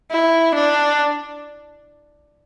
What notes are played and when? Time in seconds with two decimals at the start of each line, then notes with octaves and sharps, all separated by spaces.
0.10 E4
0.54 D4